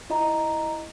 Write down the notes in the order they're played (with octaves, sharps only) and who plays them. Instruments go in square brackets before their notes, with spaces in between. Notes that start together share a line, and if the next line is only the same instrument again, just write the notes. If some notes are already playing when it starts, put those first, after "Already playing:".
[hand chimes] E4 D#5 A#5